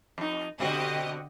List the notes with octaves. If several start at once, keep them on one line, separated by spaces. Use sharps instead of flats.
F2 D#4
B2 D3 C4 F#4 G4 D#5